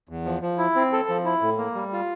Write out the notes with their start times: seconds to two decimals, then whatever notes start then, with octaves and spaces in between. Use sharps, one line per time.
0.09 E2
0.25 F3
0.42 F3
0.58 E4
0.76 C4
0.92 A4
1.09 F3
1.25 E4
1.41 A2
1.58 A#3
1.75 G3
1.92 F4